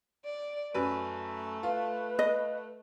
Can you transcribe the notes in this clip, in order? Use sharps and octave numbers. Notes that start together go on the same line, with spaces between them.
D5
F#2 A3 B4
F4 B4
D#5